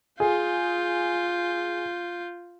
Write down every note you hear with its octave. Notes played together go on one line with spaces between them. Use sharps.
F4 G#4 G6